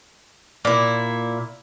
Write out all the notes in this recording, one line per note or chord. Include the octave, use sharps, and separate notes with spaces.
A#2 E4